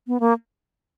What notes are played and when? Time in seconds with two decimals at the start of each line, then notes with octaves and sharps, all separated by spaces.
0.07 B3
0.20 A#3